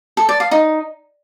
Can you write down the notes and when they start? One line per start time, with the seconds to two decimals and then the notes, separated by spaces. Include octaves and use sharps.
0.17 A4
0.29 D5
0.40 F5
0.51 D#4